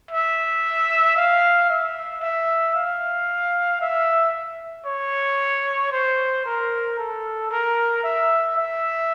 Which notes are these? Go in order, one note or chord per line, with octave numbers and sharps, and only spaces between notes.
E5
F5
E5
E5
F5
E5
C#5
C5
A#4
A4
A#4
E5
E5